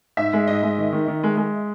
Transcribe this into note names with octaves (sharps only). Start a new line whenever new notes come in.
G#2 E5
G#3
G#2 D#5
G#3
D#3
D#3
D#3
G#3
G#3